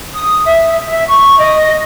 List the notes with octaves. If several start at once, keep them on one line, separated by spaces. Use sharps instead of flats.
D#6
E5
E5
C#6
D#5